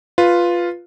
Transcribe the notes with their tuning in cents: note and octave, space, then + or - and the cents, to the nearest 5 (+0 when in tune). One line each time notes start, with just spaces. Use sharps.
F4 +0 B4 +0